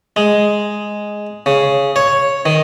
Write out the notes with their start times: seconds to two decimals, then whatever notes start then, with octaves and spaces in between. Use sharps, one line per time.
0.16 G#3
1.46 C#3
1.96 C#5
2.46 D#3